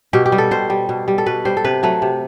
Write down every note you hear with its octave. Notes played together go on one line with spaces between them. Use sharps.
B2 G4
G4
G3
A4
B2 C5
G3
B2
G3
A4
B2 B4
G3 C5
A4
C3 B4
F#3 A3 B4
C3